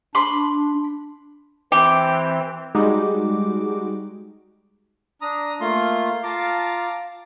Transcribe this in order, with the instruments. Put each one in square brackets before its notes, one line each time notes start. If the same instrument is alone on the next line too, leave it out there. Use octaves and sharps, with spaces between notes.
[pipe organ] D4 [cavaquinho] B5 C6 D6
[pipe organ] E3 C4 [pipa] G4
[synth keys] G3 G#3 D#4 F#4 D6
[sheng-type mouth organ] D4 A#5 D#6
A3 A#3 F4 C6
F4 F5 A5 A#5 D6